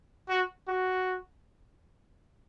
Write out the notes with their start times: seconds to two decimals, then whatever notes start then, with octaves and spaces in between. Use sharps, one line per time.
0.29 F#4
0.68 F#4